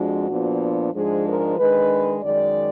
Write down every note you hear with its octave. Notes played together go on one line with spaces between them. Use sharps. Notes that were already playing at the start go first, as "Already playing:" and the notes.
Already playing: F2 F3 G#3 D4 F#4
A#2 F3 B3 D4
G#2 F3 G#3 D4 G#4
A#4
D#3 G#3 D4 B4
F#2 D#3 G#3 D5